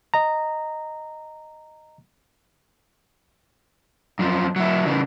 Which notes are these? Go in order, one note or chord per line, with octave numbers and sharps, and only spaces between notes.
D#5 A#5
F#2 F3
F#3 E4
C#3 E3